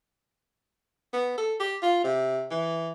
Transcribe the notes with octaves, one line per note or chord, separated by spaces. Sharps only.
B3
A4
G4
F4
C3
E3